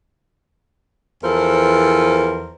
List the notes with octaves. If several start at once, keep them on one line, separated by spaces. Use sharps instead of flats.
E2 F3 A4 A#4 C5